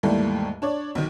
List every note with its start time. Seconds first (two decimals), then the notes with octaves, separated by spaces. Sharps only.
0.03 D#2 G#2 E3 G3 A3 A#3
0.62 D4 C#5 D5
0.95 B1 D#3